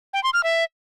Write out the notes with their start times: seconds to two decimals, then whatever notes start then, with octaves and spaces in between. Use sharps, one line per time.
0.14 G5
0.24 C6
0.34 F6
0.44 E5